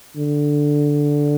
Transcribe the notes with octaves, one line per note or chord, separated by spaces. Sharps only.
D3